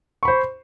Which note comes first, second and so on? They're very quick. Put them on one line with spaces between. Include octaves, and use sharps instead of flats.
C#6 B5 C5